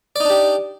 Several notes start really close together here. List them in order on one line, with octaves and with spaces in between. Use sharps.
D5 D#4 D4 G4